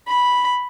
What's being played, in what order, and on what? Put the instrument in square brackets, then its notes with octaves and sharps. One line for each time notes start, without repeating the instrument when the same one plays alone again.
[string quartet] B5